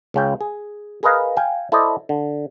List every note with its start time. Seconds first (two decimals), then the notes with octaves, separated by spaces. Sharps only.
0.14 C#2 C#3 G5
0.41 G#4
1.03 G#4 A#4 B4 D#5 F5 A#5
1.37 F5 G5 G#5
1.72 E4 A4 C5 D5 D#5
2.09 D3